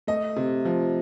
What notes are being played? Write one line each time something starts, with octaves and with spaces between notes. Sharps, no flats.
A3 D#5
C3
F3